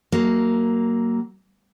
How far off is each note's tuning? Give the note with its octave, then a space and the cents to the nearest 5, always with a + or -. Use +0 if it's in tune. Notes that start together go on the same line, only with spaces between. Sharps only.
F#3 +20 A#3 -5